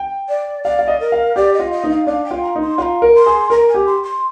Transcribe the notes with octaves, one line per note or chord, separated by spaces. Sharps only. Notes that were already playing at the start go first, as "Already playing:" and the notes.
Already playing: G5
D5
D5 F5
F5
D#5
A#4
F5
G4 D5
D#5
F4
D#5
D#4
F5
D4 F5
G5
F4
A#5
D#4
C6
F4 A#5 C6
A#4
C6
G#4
A#4 A#5
G#5
G4
C6
C6